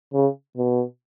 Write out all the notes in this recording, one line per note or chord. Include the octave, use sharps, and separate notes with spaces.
C#3
B2